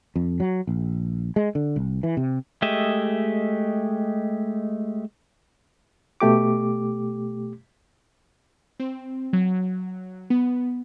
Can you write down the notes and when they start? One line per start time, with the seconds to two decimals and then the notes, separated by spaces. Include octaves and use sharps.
0.16 F2
0.40 F#3
0.67 A#1
1.36 G#3
1.55 D3
1.76 C2
2.03 E3
2.17 C3
2.62 G#3 A3 G4 D#5 E5
6.21 B2 A3 G4 D6
8.80 C4
9.33 F#3
10.30 B3